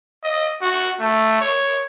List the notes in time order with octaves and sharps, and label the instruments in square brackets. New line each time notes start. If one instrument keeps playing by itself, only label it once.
[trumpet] D#5
F#4
A3
C#5